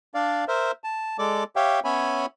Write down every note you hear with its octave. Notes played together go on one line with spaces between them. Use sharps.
D4 D5 F5
A#4 C5 E5
A5
G#3 A4 D5 D6
G4 C#5 E5 F5 G5
B3 C#4 C#5 E5 G#5 B5